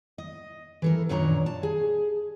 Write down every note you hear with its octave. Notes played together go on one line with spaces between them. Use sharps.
D#5
E3 A4 A#4
F#2 A#2 D#3 D4 C#5 A#5
A5
G#4